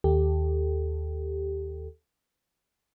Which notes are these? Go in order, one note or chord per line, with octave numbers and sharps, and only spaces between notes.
D#2 G4 A4